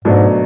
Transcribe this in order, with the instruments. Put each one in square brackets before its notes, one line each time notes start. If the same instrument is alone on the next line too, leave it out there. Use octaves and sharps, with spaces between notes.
[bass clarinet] G#2 [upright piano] B2 F#3 A3 D4